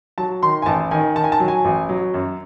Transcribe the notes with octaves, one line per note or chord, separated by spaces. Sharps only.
F#3 A5
D#3 C6
G#5
A1 A5
D#3 G#5
D#3 A5
G#5
A5
F#3
G#5
A1
F#3
F#2